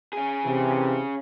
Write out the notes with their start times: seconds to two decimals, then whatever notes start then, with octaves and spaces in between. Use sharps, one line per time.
0.13 C#4 G#4
0.45 C3 E3